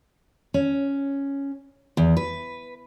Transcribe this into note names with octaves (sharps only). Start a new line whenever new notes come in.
C#4
E2
B4